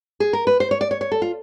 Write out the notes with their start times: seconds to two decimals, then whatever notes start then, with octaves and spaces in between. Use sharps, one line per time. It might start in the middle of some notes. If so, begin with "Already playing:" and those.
0.20 G#4
0.33 A#4
0.47 B4
0.60 C5
0.71 C#5
0.81 D5
0.91 C#5
1.01 C#5
1.12 A4
1.22 F4